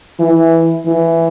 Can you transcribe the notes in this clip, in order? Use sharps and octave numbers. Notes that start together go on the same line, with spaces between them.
E3
E3